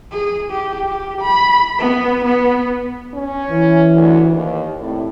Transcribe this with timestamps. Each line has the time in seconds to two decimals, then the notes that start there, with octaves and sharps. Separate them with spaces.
0.12 G#4
0.51 G4
0.89 G4
1.21 B5
1.79 B3
2.24 B3
3.14 C#4
3.49 E3
3.94 D2
4.34 D#2
4.80 A2 C3 D5